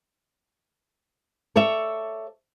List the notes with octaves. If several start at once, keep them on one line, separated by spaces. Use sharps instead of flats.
A4 C#5 D5 E5